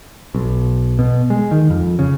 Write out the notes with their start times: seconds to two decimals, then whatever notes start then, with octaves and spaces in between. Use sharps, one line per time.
0.35 B1
0.99 B2
1.30 G#3
1.51 D#3
1.70 F2
1.99 C#3